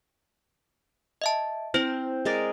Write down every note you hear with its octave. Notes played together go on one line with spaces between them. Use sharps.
D#5 E5 A5
C4 E4 C5
G#3 A#4 D5